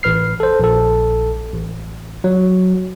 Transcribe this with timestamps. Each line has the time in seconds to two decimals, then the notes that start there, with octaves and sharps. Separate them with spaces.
0.03 A1 B4 F6 C7
0.40 A4 C5
0.60 A#1 A4
1.53 A1
2.24 F#3